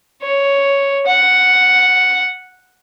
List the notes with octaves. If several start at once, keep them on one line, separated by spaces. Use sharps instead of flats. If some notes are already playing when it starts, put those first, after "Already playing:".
C#5
F#5